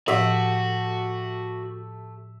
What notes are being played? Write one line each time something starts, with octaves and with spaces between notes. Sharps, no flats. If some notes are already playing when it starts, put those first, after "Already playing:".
A2 F3 A3 F#4 G4 E5